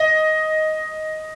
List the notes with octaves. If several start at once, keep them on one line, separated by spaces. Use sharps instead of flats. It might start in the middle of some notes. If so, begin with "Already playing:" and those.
Already playing: D#5